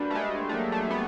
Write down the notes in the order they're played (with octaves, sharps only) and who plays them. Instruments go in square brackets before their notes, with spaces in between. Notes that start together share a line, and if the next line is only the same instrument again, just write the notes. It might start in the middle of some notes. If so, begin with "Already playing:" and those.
Already playing: [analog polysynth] G3 [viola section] A#3 D4 F#4 B4
[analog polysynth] A3
G#3
[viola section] F#3 A#3 D4 [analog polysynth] A3
[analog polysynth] A3
B3